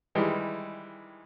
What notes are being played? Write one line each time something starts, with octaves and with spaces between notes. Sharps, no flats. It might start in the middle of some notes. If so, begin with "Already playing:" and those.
D#3 E3 G3 G#3